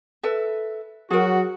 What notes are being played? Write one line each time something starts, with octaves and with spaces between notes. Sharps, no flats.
A4 B4 E5
F#3 F#4 G#4 A#4